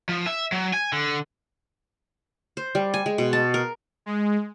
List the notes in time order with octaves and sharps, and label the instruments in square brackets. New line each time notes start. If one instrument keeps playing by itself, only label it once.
[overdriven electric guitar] F3
E5
F#3
G#5
D3
[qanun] C5
G3
G#5
G#3
B2
A5
A#4
[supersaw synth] G#3